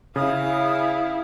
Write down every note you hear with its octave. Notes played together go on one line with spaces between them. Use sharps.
C#3 E4 F5 D#6